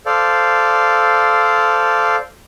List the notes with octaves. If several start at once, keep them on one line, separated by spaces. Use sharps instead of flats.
A4 C5 D5 F5